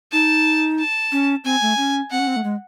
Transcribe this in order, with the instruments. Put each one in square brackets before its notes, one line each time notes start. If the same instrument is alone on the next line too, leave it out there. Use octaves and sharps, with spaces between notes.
[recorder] D#4 [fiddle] A5
[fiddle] A5
[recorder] C#4
[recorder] C4 [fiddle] G#5
[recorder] A3
C#4
[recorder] C4 [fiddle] F#5
[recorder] C#4
C4
A3
G#3